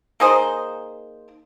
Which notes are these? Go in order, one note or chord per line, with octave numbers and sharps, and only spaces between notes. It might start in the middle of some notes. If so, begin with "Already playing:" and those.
A#3 D#4 G#4 C5